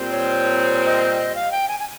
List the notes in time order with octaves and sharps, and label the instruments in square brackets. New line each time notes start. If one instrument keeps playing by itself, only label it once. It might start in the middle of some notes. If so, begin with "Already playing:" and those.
Already playing: [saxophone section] A#2 G3 C4
[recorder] C#5
D#5
F5
G5
G#5
G#5